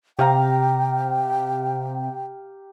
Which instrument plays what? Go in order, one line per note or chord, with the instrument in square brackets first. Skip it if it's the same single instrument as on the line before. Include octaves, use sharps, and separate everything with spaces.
[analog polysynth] C3 [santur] G4 F5 A#5 [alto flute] G5